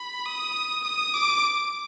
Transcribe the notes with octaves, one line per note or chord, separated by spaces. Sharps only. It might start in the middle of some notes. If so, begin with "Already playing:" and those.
Already playing: B5
D#6
D#6
D6